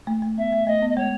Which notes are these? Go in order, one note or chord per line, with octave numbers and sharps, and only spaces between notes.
A3
A3
B3 E5
A3
A3 D#5
B3
D#5
G#3 C#5